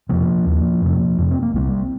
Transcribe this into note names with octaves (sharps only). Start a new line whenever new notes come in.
F2 C3 F3 A#3
D#2
F2 C3
F2 C3
C4
A#3
C2 C3 G3 C4